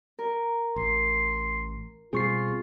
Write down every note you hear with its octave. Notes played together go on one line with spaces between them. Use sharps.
A#4
A1 C6
B2 G3 C4 F4 G#4 C#6 C7